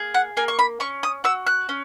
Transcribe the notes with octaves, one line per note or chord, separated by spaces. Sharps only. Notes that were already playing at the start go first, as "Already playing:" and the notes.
Already playing: A#3 G#4
F#5
A#3 G#5
C#6
B5
C#4 C#6
D#6
F#4 E6
F#6
C#4